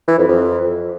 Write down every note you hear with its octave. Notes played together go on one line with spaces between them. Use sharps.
E3
F2
F2